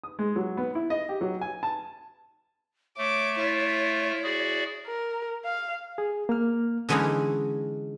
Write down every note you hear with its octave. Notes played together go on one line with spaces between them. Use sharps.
D#6
G#3
F#3
B3
E4
D#5
G4
F#3
G#5
A5
A3 C#5 D6
E4 F4
F#4 G#4 D5
A#4
F5
G#4
A#3 F6
D3 E3 G#3 C#4 D#4 E4